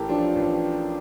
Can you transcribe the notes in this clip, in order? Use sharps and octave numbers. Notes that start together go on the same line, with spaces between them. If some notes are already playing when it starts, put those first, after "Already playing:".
Already playing: A1 A2 G4 A4 A#4
F3 D4 F4
A1